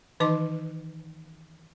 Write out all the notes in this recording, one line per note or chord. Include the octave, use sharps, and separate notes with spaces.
D#3 E3 D#4 D#5 A5 D6